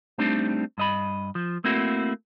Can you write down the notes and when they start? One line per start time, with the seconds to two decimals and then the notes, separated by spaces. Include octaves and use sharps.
0.18 G3 A3 C4 D4 D#4
0.78 G2 D#5 B5
1.35 F3
1.64 A3 A#3 C4 E4 F#4